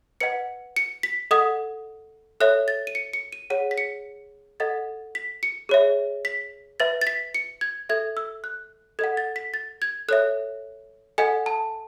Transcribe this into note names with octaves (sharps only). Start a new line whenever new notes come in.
B4 D#5 F#5 C#7
C#7
B6
A4 D#5 F#5 D#6
A4 C#5 E5 F#6
A6
D#7
C#7
C#7
D#7
G#4 C#5 F#5 D#7
B6
C#7
A4 D#5 F#5 A6
B6
C#7
G#4 C#5 E5
B6
B4 E5 A6
A6
B6
C#7
G#6
A4 E5 G#6
E6
F#6
A4 D#5 F#5 G#6
A6
B6
A6
G#6
A4 C#5 E5 F#6
A4 D#5 F#5 G#5
A5